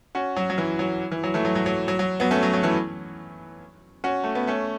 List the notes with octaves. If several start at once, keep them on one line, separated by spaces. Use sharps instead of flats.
C#4 F#4
F#3
F#3
E3
F#3
E3
F#3
E3 A3
F#3
F#3
F#3
F#3
F#3
F#3 B3
A3 C#4
F#3
F#3
E3 A3
C#4 F#4
A3
B3
A3 C#4